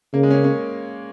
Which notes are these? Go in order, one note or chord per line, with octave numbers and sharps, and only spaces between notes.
C#3 A#3
G#3
C#4
A#3
C#4